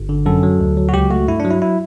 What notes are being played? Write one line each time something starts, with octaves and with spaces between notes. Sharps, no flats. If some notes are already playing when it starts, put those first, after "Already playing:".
Already playing: G1
D3
F#2 A4
F#3
D2
F#3
F#4
C#2 G4
A3 F#4
G2 E4
D4
F#3
E4
E4